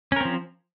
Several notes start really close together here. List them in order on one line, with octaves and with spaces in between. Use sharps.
C#4 A#4 C4 F3